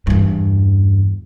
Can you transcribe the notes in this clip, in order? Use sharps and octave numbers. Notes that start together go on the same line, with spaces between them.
E2 G2